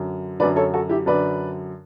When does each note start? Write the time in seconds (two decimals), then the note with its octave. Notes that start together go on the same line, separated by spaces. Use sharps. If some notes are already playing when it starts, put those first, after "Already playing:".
Already playing: F#2 D3
0.40 D3 B4 D5
0.43 F#2
0.56 A4 C#5
0.74 F#4 A4
0.89 E4 G4
1.06 F#2 D3 B4 D5